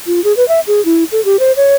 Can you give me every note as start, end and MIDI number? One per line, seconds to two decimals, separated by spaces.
0.07 0.23 65
0.24 0.35 68
0.37 0.47 71
0.48 0.60 76
0.67 0.84 68
0.85 1.04 64
1.12 1.23 69
1.25 1.39 67
1.39 1.52 72
1.57 1.76 73